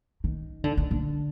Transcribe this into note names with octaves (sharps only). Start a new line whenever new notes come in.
D#3
D3
D#3
D3